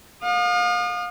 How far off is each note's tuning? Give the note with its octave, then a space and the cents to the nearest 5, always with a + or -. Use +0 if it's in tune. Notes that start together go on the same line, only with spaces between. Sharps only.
F5 +35 D#6 -35